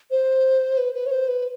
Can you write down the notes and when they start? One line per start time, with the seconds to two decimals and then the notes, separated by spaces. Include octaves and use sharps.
0.11 C5
0.78 B4
0.94 B4
1.06 C#5
1.12 C5
1.28 B4